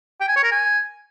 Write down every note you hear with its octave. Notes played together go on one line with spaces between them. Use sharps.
G5
G#5
C#5
A#4
G#5